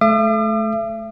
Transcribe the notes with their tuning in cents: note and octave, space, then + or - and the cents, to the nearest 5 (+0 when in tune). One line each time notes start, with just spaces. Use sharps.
A3 -30 E5 +40 D6 +45